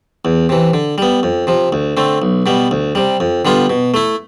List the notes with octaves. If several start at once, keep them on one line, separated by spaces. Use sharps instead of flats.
E2
C3 E3
D3
G3 B3
F2
C3 F3
D2
D3 A3 C4
B1
B2 G3 B3
D2
C3 G3
F2
D3 G3 B3 F4
B2
A3 E4